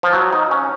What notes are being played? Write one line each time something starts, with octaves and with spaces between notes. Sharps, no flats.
F3
F#3
D#4
C#4